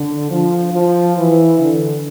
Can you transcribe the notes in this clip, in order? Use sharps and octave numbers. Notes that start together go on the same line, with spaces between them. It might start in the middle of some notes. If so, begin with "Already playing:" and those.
Already playing: D3
F3
F3
E3
D3